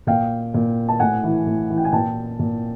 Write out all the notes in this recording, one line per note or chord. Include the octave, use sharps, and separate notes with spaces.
A#2 F5 G5
A#2
A5
A2 F#5 G#5
E3
A2
E3
G5
G#5
A#2 G5 A5
A#2